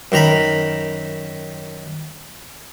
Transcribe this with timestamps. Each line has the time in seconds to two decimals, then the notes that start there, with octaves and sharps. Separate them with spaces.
0.12 F#2 D#3 A#5 B5